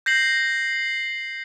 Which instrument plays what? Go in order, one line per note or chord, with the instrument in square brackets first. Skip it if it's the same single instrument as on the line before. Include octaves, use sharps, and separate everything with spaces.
[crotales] G6 A#6 C7 F#7